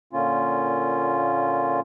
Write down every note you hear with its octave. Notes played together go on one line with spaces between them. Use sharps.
A#2 D3 A#3 C#4 F4